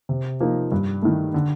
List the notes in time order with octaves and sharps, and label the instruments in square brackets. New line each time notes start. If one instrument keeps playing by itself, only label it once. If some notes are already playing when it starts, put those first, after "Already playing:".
[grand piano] C3
F3 A#3 D#4
G2
D#3 A3
D3